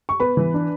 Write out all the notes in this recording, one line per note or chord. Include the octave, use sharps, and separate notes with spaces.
C#6
B3 B4 B5
E3
D4